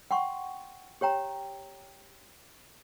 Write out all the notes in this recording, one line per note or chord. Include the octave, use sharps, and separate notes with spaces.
F#5 G5 C6 C#6
G4 C#5 G5 A#5